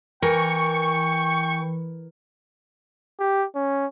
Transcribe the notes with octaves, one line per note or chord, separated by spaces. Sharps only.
E3 A#4 G5 C#6
G4
C#4